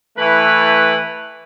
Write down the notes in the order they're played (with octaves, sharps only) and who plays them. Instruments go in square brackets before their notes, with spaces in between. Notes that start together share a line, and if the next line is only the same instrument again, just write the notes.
[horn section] E3 A3 E4 B4